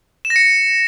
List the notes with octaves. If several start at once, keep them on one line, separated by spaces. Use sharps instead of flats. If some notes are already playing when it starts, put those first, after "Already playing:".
E7
A#6
C#7